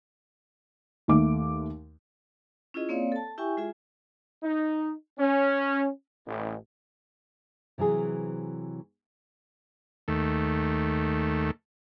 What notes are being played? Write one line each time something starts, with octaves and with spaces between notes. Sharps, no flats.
D#2 A3 D6
C#4 E4 F4 G#4 D#5
A#3 C4 C#5 D5 F5
A4 A5
E4 G4 E5 G5 G#5 C#6
G#3 F4 G#4 E5 G#5
D#4
C#4
A1
C3 E3 F#3 G#4
D#2 A3